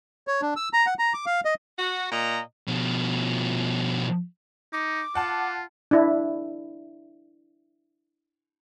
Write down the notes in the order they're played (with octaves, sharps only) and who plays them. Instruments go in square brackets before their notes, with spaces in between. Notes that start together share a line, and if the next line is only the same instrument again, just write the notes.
[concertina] C#5
D4
E6
A#5
F#5
A#5
D6
F5
D#5
[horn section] F#4
A#2 D#5 A#5
[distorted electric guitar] B2 F3
[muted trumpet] D#4 [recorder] D6
[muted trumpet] F4 [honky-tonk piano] F#5 A5
[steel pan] D4 E4